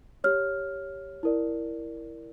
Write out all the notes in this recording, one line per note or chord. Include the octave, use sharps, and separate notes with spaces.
G4 C#5 F6
E4 A#4 D5